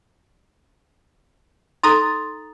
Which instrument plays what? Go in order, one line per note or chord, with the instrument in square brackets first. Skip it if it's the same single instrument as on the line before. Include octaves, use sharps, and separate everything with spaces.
[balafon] D#4 A4 [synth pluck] A#5 D#6 A6 [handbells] C6